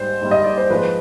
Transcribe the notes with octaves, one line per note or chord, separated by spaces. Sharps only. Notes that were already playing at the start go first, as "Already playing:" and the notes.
Already playing: G#2 G3 C5
G#2 G3
D#5
D5
C5
G#2 F3 G#3 B4